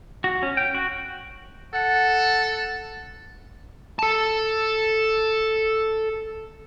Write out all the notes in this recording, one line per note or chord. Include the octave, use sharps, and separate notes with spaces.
F#4
C#4
G5
F#4
A4 F#5
A4 A5